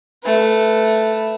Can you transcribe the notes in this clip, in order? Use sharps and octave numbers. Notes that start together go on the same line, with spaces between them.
A3 B4